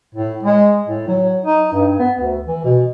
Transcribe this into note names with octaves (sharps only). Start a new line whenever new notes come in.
A2
G#3
A2
F#3
D#4
G2
B3
D2
E3
B2